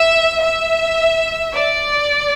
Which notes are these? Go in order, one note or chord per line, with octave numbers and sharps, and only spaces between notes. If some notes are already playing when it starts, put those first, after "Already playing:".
Already playing: E5
E5
D5